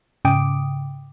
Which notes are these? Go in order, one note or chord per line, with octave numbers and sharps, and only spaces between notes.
G#2 C#3 G5 D6 D#6 D7